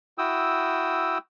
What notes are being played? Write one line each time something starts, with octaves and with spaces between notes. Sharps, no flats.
E4 F#4 G5 D#6 E6